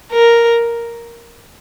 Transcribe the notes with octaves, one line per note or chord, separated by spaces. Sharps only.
A#4